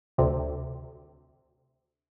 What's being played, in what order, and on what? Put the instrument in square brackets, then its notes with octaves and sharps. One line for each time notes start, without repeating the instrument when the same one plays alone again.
[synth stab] D2 C3